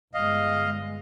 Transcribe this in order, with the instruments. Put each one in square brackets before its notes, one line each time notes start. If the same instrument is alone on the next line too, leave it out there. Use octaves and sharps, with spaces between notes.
[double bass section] G1 G#3 [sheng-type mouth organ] D#5 F5